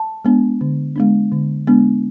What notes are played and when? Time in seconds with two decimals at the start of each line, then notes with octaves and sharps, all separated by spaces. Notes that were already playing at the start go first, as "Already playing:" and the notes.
Already playing: A5
0.25 G#3 B3 D4
0.61 D3
0.96 G#3 B3 D4
1.32 D3
1.67 G#3 B3 D4